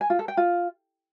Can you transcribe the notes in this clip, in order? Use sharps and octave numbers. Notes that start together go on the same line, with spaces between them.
G#5
F4
A4
G5
F4